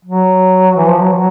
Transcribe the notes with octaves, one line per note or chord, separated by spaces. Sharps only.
F#3
E3
F3
F#3
F#3